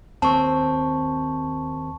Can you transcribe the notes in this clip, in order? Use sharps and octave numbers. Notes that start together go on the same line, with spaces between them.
D#2 C4 A5 C#6